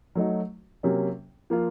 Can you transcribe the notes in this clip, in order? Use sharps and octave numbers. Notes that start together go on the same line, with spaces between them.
F#3 A3 D#4 F#4
C3 F#3 A#3 C#4
F3 A#3 F4